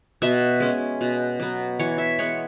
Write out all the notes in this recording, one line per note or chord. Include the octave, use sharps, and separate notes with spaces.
B2 E5
G#3 C#4
B2
F#3 B3
E3 C#5
E5
G#3 B3 C#5